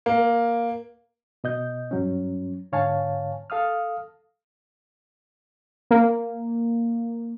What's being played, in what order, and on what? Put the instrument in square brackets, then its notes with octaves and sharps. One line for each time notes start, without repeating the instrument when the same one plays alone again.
[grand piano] A#3
[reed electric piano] B2 D#5 G6
G2 F#3 C#4
G#2 D3 C#5 F5 G#5 A5
A4 F5 D#6 F6
[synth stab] A#3